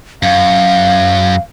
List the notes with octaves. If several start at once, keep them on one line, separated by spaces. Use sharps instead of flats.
F#2 F5